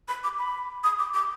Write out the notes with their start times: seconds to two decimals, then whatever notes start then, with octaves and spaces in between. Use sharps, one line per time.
0.08 B5
0.24 D6
0.38 B5
0.84 D#6
0.99 D6
1.14 D6